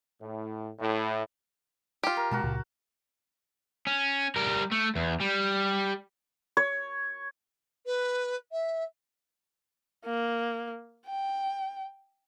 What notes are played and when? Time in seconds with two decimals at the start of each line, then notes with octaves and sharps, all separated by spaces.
0.21 A2
0.80 A2
2.03 F4 G4
2.17 A#4
2.31 B2 G#3 F#4 A#4 A5
2.43 C#2 A#2 C#3
3.87 C#4
4.36 G3 A#4
4.72 A3
4.96 E2
5.21 G3
6.57 C#5
7.86 B4
8.52 E5
10.06 A#3
11.07 G5